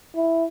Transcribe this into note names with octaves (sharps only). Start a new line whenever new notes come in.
E4